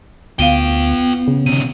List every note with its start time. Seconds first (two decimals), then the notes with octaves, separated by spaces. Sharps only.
0.39 D2 B3 F4 F5 G5 D#7 G7
1.28 C#3
1.46 C3 D#3 D#7